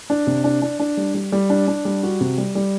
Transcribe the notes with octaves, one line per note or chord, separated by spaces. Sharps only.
D4
C3
D4
D4
D4
G3
G3
G3
D4
D4
G3
F#4
C3
G3
G3